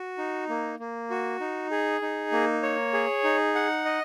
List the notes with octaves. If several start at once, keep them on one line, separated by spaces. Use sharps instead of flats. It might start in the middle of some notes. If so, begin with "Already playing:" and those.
Already playing: F#4
D#4
A#3
A#3
F#4
D#4
G#4
D#4
A#3
C#5
G#4
D#4
F#5
D#5